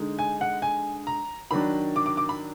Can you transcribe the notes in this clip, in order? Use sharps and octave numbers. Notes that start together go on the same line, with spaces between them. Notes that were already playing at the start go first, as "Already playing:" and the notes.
Already playing: D3 G#3 D#4
G#5
F#5
G#5
A#5
D#3 F#3 D4 B5
D6
D6
D6
B5